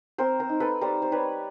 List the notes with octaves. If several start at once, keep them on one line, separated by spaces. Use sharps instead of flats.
C4 A#4 C5
A#4 C5
D#4
A4 B4
G3 A#4 C5
C5
G3 B4 C#5